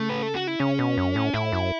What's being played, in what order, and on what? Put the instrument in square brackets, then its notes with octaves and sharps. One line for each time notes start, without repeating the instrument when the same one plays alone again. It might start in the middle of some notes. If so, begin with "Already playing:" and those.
Already playing: [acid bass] C#3 [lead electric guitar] A3
[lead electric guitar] B4
A4
F#4
E4
[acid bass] C#3 [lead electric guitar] C#4
[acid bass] B2
F#2
A2
[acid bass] A2 [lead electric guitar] E4
[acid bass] F#2